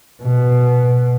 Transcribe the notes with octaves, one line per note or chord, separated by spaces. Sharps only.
B2